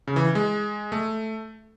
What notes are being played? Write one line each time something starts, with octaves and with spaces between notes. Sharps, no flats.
C#3
E3
G#3
A3